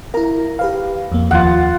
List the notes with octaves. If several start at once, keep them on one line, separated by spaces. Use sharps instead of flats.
E4 A#4 A#5
G4 B4 F5
F2 A#3
D#2 F3 F4 F#5 A6